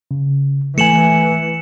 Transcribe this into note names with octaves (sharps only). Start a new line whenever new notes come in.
C#3
E3 A3 G#5 C#7 E7 F#7